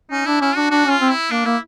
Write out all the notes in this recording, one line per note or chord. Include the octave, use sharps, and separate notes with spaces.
C#4 D#4
D4 E4
C#4 E4
D4 F#4
D4 F#4
C#4
F4
C4
E4
A#3 D4
A#3 E4